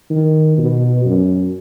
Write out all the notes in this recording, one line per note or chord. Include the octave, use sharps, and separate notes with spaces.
D#3
B2
F#2